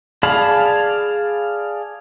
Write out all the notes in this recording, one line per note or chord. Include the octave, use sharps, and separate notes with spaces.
G#4 D5 F5 A5 B5